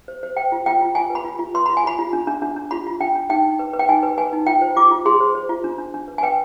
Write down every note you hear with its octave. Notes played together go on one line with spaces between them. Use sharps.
C5
C5
C5 G5
F4
F4 G5
F4
F4 G#5
B4
B5
F4
F4
B4 C6
F4 B5
G#5
F4 B5
F4
D4
D4
D4
D4
F4 B5
F4
D4 G5
D4
D#4 G5
D#4
B4
B4
G5
D#4 G#5
B4
B4 G#5
D#4
F4 G5
C5
F4 D6
F4
G#4 C6
C5
C5
F4
D4
D4
D4
B4
G#5
B4 G5